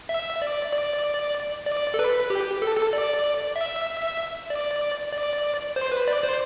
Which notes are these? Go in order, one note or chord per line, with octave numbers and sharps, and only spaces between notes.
E5
E5
D5
D5
D5
A4
B4
G4
A4
A4
D5
E5
D5
D5
C5
B4
D5
C5